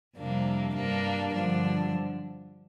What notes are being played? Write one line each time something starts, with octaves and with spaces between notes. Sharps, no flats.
F2 C3 G3 A#3 D4
G2 G3 A#3 D4
G2 D3 F3 D4